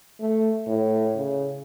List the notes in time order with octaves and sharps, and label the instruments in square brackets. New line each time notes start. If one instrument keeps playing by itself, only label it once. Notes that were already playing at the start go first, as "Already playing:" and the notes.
[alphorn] A3
A2
C#3